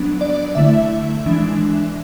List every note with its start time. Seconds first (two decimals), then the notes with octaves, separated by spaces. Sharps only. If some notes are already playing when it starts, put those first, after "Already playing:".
Already playing: F#3 B3 D4
0.21 D5
0.55 D3 A3 E4 E5
1.26 E3 G#3 D4